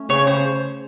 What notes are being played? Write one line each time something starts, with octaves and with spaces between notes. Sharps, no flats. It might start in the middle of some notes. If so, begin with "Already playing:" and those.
Already playing: A3 C#4
C#3 C#5
C#3 C5